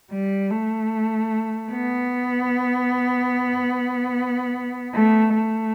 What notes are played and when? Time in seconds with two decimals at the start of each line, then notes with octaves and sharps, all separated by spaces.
0.11 G3
0.51 A3
1.72 B3
4.94 A3
5.34 A3